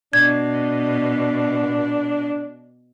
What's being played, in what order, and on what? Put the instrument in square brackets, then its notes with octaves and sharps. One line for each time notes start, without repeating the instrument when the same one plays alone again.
[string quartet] B2 [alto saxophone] D4 [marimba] G#6